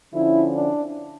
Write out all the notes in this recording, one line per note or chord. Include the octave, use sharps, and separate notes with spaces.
D3 F3 C#4 E4
D4